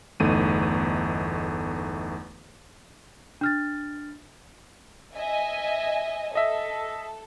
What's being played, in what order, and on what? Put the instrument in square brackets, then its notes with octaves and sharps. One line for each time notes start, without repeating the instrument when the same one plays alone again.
[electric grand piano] G1 E2 A3 D#4 D#7
[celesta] D4 F6 A6
[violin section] D#5 E5 G#5
[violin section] A4 [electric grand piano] D#5 E5